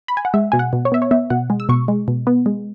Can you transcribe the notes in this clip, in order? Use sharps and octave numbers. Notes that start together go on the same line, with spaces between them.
B5
G#5
F#5
G#3 E5
B2 G#5
F#5
B2
C#5
B3 E5
C#5
B3 E5
B2 F#5
G#3
E6
B2 C#6
G#3
B2
B3
G#3